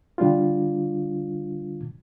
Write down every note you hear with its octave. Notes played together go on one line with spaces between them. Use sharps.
D3 G3 D4 F4